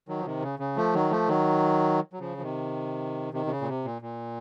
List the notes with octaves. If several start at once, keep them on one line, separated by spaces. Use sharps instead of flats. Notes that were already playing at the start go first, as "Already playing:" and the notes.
D#3 F#3
F3
C3 D#3
C#3
C#3
F3 A3
D#3 F#3
F3 A3
D#3 F#3
F#3
C#3 F3
F3
C3 D#3
C3 D#3
C3
C#3
A#2
C3
A#2
A#2